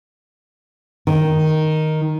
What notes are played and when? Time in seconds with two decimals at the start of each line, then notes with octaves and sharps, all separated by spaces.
1.07 D#3